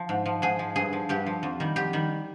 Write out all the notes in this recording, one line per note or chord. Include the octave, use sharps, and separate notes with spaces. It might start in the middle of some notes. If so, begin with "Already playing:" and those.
Already playing: F3
G#2
F3
G#2 G#4
F3
G2 G#4
F3
G2 G4
F3
F2
D#3 G3
F2 G4
D#3 G3